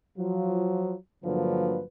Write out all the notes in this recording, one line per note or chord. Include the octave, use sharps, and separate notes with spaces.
F3 F#3 F4
G2 D3 F3 F#3 A#3 B4